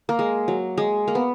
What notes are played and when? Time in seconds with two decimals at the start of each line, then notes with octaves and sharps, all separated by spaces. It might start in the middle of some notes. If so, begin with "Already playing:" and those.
0.09 A#3
0.19 G#3
0.48 F#3
0.77 G#3
1.08 A#3
1.15 B3